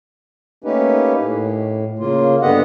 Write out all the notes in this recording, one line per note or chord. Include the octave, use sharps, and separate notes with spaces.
A3 A#3 C#4 D#4 G4 B4
A2
C#3 A#3 F4
G2 D3 B3 G4 D#5 F#5